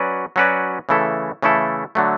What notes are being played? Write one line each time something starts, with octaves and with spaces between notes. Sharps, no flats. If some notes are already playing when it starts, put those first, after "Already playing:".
Already playing: F#3 C#4 F#4 B4 D5
F#3 C#4 F#4 B4 D5
C#3 E3 A3 E4 A4
C#3 E3 A3 E4 A4
D3 F#3 A3